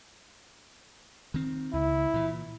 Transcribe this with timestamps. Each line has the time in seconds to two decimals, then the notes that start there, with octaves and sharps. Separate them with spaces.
1.34 D#3 C4
1.73 C#2 E4
2.14 A#2 E3